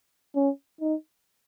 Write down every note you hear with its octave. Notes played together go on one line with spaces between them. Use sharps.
C#4
D#4